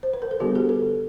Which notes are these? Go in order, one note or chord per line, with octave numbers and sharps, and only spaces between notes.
C5
B4
A#4
A4
D3 G3 B3 D4 F#4 G#4
G4 A4
A4 B4